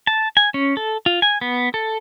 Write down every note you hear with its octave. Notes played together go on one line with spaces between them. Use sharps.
A5
G#5
C#4
A4
F4
G#5
B3
A4